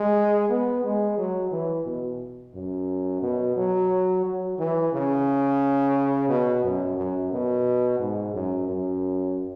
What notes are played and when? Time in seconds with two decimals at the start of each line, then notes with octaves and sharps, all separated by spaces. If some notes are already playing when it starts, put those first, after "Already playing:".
Already playing: G#3
0.50 B3
0.84 G#3
1.18 F#3
1.52 E3
1.86 B2
2.55 F#2
3.22 B2
3.56 F#3
4.25 F#3
4.59 E3
4.93 C#3
6.29 B2
6.64 F#2
6.97 F#2
7.32 B2
8.00 G#2
8.35 F#2
8.69 F#2